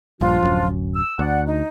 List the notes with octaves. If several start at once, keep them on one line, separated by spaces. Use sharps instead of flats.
A#1 G2 F3 D4 F4
D1 G#1 F#2
E6
D2 D5 F#5
D#4